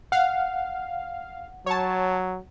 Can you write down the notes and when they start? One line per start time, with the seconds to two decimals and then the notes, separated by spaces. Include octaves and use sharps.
0.12 F5 F#5
1.66 F#3 C#5 A5